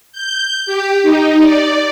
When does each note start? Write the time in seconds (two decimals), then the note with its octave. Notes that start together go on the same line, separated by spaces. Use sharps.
0.12 G6
0.66 G4
1.02 D#4
1.41 D5